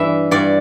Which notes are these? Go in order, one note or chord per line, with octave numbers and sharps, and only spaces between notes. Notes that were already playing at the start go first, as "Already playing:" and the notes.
Already playing: G2 E3 E5
G2 D5